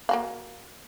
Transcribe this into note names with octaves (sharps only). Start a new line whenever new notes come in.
A#3 F#4 F5